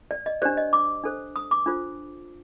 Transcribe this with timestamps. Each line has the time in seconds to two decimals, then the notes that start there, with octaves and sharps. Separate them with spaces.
0.11 D5
0.26 D#5
0.42 D4 G4 C5 D5
0.57 D#5
0.73 D6
1.04 D4 A4 C5
1.36 D#6
1.51 D6
1.66 D4 F4 A4 C5